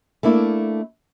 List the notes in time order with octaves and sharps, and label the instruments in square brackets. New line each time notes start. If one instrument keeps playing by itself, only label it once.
[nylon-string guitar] A3 A#3 D4 E4